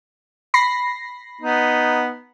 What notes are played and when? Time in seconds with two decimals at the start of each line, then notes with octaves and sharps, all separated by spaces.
0.54 B5 A#6 C7
1.41 B3 D#4